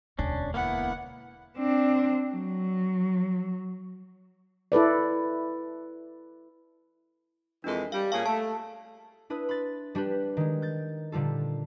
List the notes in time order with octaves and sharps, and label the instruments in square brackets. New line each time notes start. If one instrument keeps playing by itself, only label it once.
[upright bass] E1 D2 [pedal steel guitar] C#4 D4
[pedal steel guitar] A#3 B3 E4 [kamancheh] F#5
[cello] C4 D4
F#3
[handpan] E4 A4 B4 D5
[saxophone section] F2 E3 G#3 [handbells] D4 A#4
[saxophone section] G3 [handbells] F5
[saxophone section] A#2 C#4 G#4 [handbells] F5 A5 C#6
[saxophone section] A3 [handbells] A5
[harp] D4 E4 B4 D#6
B5 C6 A6
G3 D4 G4 B4
D#3 G#3
G6 A6
A#2 D3 G3 F4 A4